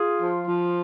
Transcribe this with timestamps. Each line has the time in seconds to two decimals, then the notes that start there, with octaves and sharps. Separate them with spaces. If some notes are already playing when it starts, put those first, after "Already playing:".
Already playing: F4 G#4
0.21 F3
0.48 F3